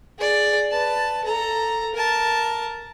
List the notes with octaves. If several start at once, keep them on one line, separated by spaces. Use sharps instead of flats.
G#4 D5
B4 A5
A4 A#5
A#4 A5